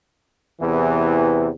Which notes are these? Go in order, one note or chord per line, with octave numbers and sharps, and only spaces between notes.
E2 C3 E3